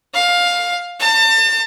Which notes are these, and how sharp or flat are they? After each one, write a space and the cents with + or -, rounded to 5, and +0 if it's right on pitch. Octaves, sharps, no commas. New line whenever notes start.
F5 +15
A5 +35